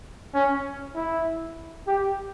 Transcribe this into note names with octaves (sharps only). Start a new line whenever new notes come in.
C#4
E4
G4